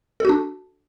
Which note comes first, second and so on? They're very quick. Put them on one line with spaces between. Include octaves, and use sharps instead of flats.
A4 F#4 D4